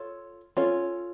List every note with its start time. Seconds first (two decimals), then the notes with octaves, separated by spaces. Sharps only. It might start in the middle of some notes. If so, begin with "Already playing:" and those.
Already playing: F4 A4 C#5
0.57 C#4 F4 A4 C#5